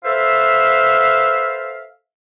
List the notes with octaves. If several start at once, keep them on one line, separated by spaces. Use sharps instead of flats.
A4 B4 C5 E5 F5